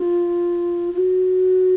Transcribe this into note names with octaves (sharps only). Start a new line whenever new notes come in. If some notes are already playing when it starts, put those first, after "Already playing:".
Already playing: F4
F4
F#4